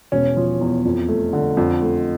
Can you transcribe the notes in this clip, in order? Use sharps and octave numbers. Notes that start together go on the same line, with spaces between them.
E1 C#4
F3
E2
F2
A3
D3
F2
A3